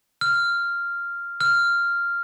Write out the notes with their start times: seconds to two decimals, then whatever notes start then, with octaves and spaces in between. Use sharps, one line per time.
0.21 F6
1.41 F6